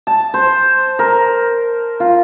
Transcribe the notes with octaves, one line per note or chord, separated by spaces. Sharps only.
A5
C5
A#4
F4